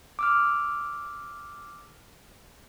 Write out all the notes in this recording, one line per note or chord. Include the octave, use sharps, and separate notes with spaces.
D6 E6 F6